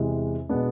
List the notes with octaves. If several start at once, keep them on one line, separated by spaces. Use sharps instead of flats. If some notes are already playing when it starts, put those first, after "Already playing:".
Already playing: E2 C3 E3 G#3
B2 G#3 B3 D4